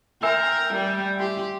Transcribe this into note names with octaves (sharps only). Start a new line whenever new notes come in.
A#4 E5 G5 G#5 E6
G3
G4 C6